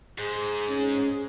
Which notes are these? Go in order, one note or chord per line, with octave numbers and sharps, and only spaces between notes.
G#2 G#4
C#4